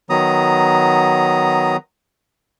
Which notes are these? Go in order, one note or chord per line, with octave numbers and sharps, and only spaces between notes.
D#3 F#3 B3 A#5 D#6